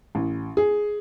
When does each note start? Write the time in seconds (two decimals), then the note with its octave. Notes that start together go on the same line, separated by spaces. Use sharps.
0.15 A1
0.57 G#4